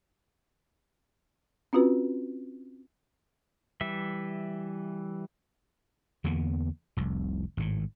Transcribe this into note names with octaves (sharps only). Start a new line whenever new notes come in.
C4 C#4 F4 F#4 B4
E3 G3 E5
E2 D3 A#3 B3
F1 C2
G#1 A2